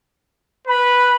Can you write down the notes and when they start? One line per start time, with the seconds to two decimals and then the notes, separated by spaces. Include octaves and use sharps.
0.67 B4 B5